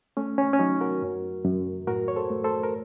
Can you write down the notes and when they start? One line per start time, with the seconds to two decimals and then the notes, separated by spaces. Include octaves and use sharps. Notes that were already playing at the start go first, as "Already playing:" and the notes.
0.17 A3 C#4
0.38 C#4
0.53 C#4
0.59 F#3 D#4
0.81 F#4 A#4
1.02 F#2
1.45 F#2
1.87 A2 F#4 A#4
2.08 C#5
2.16 A4 C5
2.30 A3
2.44 A4 C5
2.63 A#4